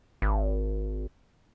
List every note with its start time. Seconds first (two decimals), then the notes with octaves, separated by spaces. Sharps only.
0.22 G#1